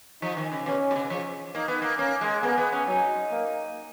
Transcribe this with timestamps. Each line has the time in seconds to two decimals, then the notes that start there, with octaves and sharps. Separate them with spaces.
0.22 F3 D#4
0.37 D#3
0.52 C#3
0.66 B2 C#4
0.91 B2
0.96 C#3
1.10 F3
1.55 A#3 D#4
1.68 B3
1.82 A#3
1.98 A#3 C#4
2.21 G#3
2.43 A#3 B3
2.58 B3
2.72 C#4
2.87 F#3 D#4
3.31 A#3